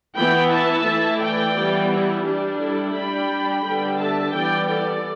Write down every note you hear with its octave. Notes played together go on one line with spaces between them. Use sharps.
E3 B3 E4 G5 B5
E5 A5
E3 A3 E4
D5 G5
E3 G3 B3
E4
G3 D4 G4
E4 A4
G3 D4 G5 B5
D3 G3 B3 D4
E5 A5
E3 G3 B3 D5 G5
A4 D5